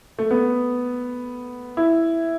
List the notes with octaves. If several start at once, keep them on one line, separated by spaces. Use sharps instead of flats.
A3
B3
E4